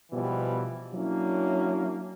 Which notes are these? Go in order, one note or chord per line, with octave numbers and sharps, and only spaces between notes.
B2 E3 F3 G3 B3
F#3 A#3 C#4 D4 E4